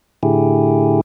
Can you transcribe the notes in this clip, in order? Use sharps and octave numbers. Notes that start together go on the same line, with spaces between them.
A2 D3 E4 G4 G#4